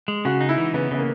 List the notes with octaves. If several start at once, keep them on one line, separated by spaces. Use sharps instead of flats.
G#3
C#3 F#4
D#4
E4
E3
C#3 B3
C#3 B3
A#3